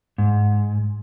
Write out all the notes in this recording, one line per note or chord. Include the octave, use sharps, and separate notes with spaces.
G#2